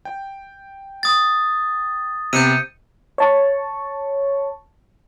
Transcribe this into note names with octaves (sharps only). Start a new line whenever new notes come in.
G5
D#6 A6
C3 B3 G6 C#7 D#7
C#5 A5 C#6